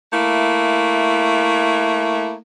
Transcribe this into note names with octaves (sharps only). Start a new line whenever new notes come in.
A3 A#3 E4